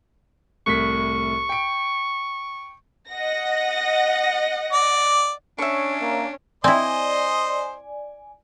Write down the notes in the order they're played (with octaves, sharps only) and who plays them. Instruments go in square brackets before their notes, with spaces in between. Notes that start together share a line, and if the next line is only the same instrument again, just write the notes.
[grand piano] C2 A2 B6 [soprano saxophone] C#6
[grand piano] G5 D7
[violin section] D#5 F#5 A#6
[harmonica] D5
[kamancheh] C#4 C#5 [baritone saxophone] D4 [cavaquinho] E5 C#6
[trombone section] A#3
[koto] C4 E4 [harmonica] C5 D#5 C6 [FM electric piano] D5 G#5